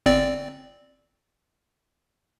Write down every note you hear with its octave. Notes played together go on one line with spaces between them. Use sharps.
G1 C4 D5